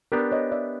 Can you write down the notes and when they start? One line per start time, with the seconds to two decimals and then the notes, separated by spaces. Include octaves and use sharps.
0.12 B3 D4 G4 A#4
0.32 C#5 D#5
0.52 D5 E5